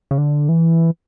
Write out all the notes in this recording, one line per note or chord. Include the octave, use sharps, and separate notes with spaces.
C#3
D3
E3